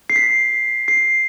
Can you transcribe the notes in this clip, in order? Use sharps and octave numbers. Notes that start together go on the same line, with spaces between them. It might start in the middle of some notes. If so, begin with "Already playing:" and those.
C7
B6
C7